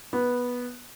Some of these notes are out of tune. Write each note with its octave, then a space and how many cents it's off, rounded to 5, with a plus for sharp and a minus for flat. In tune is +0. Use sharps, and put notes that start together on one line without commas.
B3 -10